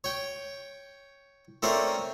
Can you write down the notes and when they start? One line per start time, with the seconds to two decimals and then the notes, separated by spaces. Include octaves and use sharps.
0.04 C#5 G5
1.63 A3 C4 C#4 A#4 D5 F5